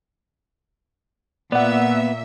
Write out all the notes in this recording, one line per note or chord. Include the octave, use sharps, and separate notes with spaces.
A#2 B3 D5 E5 F#5